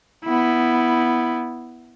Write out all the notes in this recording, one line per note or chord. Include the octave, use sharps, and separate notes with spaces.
B3 E4